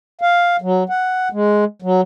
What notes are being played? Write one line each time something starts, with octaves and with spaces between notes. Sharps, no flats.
F5
F#3
F#5
G#3
F#3